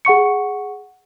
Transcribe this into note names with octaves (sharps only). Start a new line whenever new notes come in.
G#4 F#5 C#6 C#7